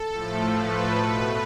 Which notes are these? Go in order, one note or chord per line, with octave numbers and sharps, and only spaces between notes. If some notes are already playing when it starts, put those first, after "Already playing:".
Already playing: A4
A2 F3 A3
B4
B2 A3